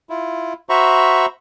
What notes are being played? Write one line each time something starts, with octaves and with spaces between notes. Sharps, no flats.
E4 F4
F#4 C5 E5 A#5 B5 C#6